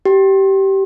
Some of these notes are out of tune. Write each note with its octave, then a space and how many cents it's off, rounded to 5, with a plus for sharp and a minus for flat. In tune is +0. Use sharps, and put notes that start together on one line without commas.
G4 -20